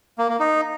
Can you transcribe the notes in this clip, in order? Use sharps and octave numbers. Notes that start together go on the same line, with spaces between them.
A#3
A#3
D#4